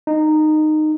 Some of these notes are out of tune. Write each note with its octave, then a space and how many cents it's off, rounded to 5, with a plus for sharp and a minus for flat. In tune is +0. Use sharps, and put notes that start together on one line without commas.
D#4 -15